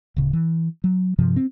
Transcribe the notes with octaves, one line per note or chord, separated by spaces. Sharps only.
D1 C#3
E3
F#3
G2 C3 F3
C4